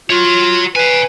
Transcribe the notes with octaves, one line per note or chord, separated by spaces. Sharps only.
F4 F#4 C#5
B4 F5 G#5